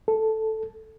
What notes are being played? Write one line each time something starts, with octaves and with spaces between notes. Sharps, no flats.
A4